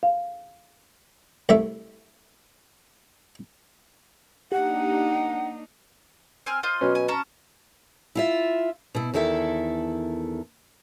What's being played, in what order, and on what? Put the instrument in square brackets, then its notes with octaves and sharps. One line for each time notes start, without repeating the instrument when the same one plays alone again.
[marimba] F5
[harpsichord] C2 A3 E5
[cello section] A#3 D4 D#4 [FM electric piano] G4 [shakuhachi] F#5
[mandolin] C4 G#5 F6
F4 C5 D#5
[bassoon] B2 [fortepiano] F#3 C#4
[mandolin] G#5
C#4 A5 A#5
[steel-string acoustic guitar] E4 F4 E5
B2 E4
E2 D#3 E4 A4 E5